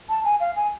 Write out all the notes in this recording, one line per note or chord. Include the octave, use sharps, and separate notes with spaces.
A5
G#5
F5
G#5